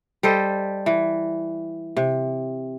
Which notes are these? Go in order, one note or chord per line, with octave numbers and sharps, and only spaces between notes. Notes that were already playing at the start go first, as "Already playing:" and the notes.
G3 A4 C5 D#5
E3
C3